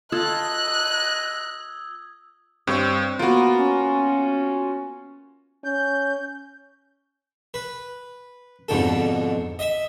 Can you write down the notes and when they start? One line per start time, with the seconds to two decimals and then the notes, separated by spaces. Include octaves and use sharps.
0.12 F4 A4 D#5 A5 D#6 E6 F#6 G#6
2.67 G2 C4 C#5
3.19 A#3 B3 F4 F#4
3.58 C#4
5.64 C#4 G6
7.54 B4
8.69 F2 G#2 B2 D3 A4
9.59 D#5 E5